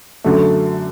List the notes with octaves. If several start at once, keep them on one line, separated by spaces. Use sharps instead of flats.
F#2 D3 F#3 A3